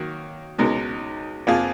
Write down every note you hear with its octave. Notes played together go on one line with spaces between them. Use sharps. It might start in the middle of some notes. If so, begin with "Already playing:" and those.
Already playing: D#3 F#3 A#3
C#2 B2 G#3 D#4 A#4
F2 F3 A#3 F4 G#4